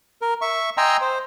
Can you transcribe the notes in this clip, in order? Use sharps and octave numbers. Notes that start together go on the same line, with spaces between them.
A#4
E5 C#6
D#5 G5 G#5 A#5 C6 E6
C5